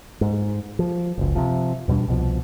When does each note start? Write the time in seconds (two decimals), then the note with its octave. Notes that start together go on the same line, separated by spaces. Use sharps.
0.21 G#2
0.79 F3
1.18 F#1 C#2
1.35 C3 F3
1.88 E2 B2 G3 D4
2.08 C2 B2 F3